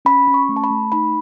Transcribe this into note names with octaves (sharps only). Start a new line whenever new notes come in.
C#4 B5
C#4
C#6
A3
A5
B5
A3
D#4 B5